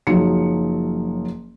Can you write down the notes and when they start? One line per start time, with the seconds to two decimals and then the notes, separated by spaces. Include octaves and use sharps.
0.07 F#1 F3 F#3 D#4 C#7